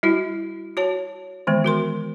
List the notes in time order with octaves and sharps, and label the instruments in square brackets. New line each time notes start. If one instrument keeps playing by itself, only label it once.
[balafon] G3 E4 F#4
F#4 C#5 A5
D#3 E3 G#3 B3
F#4 A#4 C6